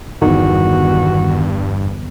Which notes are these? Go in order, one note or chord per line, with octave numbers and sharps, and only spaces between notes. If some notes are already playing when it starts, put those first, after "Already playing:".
G1 E2 G2 D#3 F#4